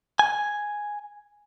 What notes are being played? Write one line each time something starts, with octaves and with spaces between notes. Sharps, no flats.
G#5